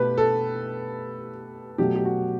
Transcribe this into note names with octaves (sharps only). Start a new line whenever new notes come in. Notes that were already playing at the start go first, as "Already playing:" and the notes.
Already playing: B2 A3 G4 B4
A4
B2 F#3 A3 G4
G4
F#4